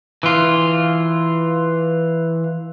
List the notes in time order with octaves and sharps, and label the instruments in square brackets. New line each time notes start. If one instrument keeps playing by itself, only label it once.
[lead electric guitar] E3 F4